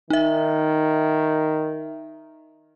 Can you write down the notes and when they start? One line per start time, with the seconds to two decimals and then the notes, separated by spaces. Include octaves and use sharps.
0.10 D#3 D#4 E5